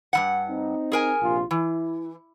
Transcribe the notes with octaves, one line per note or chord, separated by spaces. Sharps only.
G2 E3 F#5
C4 D#4
G#4 A#4 G#5
A#1 C3 F4
E3 E4